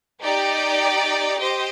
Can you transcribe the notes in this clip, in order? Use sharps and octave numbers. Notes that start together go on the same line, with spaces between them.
D#4 G4 D5
G4 C5 D#5